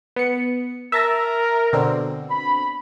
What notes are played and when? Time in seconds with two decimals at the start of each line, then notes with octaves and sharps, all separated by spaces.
0.16 B3 C#7
0.92 A#4 E5 A5 A#6
1.73 B2 D3 C4
2.29 B5